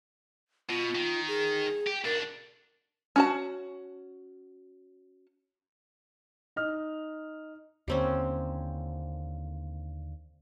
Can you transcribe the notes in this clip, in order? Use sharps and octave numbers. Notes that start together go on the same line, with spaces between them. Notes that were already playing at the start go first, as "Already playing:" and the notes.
B2 F4
D#3
G#4
G4
B1 D4 A#4
C#4 F#4 A5
D#4 F6
D#2 D3 G3 A#3 C4 C#4